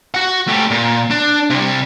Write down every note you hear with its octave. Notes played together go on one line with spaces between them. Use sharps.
F#4 F#5
A3 G4
A#2
D4
C3 G3